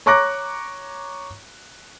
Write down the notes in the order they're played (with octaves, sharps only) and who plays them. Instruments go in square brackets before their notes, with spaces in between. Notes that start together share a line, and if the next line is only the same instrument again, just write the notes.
[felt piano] C#5 A#5 C#6 D6 F#6 A#6